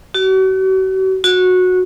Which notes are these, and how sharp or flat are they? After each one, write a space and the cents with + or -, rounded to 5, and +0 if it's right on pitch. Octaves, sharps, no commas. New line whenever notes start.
F#4 +40
F#4 -15